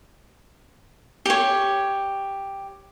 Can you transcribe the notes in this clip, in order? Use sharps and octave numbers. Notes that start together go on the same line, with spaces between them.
G4 C#5